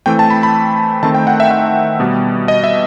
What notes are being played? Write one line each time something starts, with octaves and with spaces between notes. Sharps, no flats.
E3 A3 C4 G5
A5
B5
B5
D#3 A3 C4 A5
G5
F#5
E5
E5
B2 G3 B3
D#5
E5